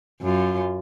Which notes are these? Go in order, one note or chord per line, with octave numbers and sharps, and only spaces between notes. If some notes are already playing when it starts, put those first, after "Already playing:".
F#2 F4